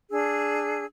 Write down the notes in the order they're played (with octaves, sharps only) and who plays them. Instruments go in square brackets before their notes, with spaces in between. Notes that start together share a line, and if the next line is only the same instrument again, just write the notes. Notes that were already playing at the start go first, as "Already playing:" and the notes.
[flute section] D4 G#4 E6